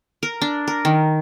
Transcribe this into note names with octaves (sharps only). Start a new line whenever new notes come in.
A#4
D4
A#4
D#3